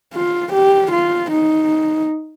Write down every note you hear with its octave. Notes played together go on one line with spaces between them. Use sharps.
F4
G4
F4
D#4